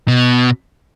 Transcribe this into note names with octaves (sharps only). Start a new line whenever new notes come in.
B2